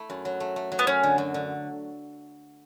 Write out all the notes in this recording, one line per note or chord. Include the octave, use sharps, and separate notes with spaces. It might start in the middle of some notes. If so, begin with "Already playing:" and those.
Already playing: A3 E4
F#2
F#3
A3
A3
F#3
B3
F#2 C#4
D3
F#2
D3